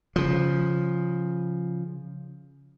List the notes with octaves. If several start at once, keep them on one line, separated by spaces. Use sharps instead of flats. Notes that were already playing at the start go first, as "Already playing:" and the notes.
C#3 F3